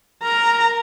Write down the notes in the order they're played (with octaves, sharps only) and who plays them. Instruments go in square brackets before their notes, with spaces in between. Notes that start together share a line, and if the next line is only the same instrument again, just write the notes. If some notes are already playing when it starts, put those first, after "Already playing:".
[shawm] A#4 [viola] A#5